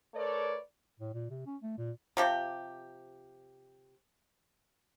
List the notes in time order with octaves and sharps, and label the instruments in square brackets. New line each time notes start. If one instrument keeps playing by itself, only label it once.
[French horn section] A3 A#4 B4 C#5 D5
[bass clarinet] A2
A#2
C3
C#4
A3
A#2
[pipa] C3 F3 G4